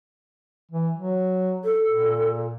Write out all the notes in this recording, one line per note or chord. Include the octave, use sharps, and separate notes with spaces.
E3
F#3
A4
A#2